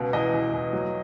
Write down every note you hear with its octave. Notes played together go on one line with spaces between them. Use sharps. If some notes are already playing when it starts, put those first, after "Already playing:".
Already playing: C#2 B2
E2 D#5
E2
E2
F#3